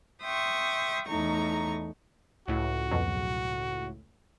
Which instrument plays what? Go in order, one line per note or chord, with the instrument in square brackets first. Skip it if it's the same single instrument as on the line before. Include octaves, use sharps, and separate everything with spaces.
[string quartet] E5 G5 C6 C#6 D#6
E2 A2 A3 D#4 A#5 C#6
[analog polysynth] C#2 A2 [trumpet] F#4
[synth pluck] F2 B2 F#3